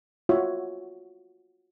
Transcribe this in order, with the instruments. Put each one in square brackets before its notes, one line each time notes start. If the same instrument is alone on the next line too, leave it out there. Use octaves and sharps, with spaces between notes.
[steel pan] F4 F#4 C#5 E5